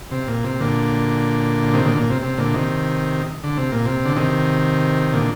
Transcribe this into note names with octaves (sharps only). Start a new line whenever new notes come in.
C3
A#2
C3
A#2 D3
C3 D#3
A#2 D3
A#2
C3
C3
A#2 D3
C3 D#3
D3
C3
A#2
C3
D3
C3 D#3
A#2 D3